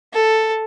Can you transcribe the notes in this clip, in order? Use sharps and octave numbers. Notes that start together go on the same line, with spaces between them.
A4